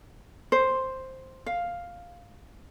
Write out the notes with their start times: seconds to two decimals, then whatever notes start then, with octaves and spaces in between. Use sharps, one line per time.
0.52 C5
1.46 F5